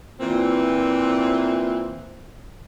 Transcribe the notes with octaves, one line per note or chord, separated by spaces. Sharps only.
A#2 E3 C4